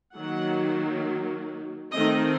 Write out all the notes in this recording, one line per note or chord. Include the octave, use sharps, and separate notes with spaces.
D#3 F#3 A#3 F#5
D#3 A3 C4 D#5